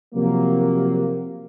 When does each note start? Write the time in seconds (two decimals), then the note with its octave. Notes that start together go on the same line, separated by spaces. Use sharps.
0.15 C3 F3 F#3 A#3